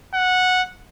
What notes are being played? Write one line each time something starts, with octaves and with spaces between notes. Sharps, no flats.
F#5